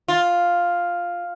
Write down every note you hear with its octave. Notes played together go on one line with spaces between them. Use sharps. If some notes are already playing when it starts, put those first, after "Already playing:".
F4